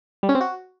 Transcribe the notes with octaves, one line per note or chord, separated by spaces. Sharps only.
G3
C#4
C4
F#4